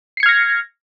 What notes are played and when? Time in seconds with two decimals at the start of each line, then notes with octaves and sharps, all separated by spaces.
0.17 C7
0.20 C#7
0.23 G#6
0.26 F6
0.29 A#6